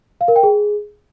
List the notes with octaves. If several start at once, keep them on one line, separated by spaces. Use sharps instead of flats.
F5
A#4
G5
G#4